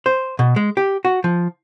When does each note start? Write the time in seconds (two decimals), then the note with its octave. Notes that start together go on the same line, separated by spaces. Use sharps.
0.06 C5
0.39 B2
0.56 G#3
0.77 G4
1.05 F#4
1.24 F3